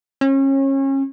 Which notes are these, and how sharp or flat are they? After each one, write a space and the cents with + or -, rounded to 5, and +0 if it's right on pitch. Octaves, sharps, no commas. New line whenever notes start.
C#4 -30